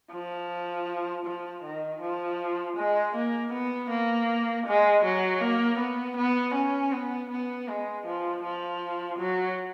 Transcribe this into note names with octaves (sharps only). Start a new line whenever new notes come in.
F3
F3
D#3
F3
G#3
A#3
B3
A#3
G#3
F#3
A#3
B3
B3
C#4
B3
B3
G#3
F3
F3
F#3